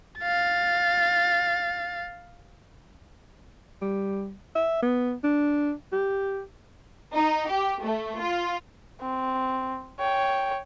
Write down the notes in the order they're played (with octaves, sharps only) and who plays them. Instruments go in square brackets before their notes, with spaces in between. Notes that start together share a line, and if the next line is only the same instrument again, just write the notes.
[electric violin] F5 A6
[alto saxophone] G3
E5
B3
D4
G4
[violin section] D#4
G4
A3
F4
[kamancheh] C4
C#5 G5